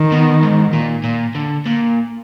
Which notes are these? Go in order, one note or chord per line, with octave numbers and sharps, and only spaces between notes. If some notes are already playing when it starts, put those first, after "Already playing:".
Already playing: D#3
B2
G#2
A#2
A#2
D3
A#2